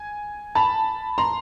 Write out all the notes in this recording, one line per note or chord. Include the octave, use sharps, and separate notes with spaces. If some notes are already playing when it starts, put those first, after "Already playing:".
Already playing: G#5
A5 B5
A#5 C6